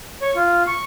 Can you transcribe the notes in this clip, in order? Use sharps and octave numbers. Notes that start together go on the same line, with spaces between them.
C#5
F4
C#6